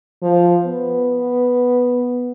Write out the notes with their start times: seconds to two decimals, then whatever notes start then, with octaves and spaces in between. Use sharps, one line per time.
0.22 F3
0.65 B3